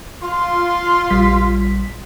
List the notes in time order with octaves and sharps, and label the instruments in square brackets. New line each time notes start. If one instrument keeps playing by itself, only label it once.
[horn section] F4 C6
[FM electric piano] A#1 G3 B6